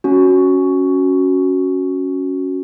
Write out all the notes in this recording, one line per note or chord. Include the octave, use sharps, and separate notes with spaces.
C#4 F#4